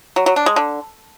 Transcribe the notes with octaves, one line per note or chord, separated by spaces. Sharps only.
F#3
F#3
D4
G#3
D3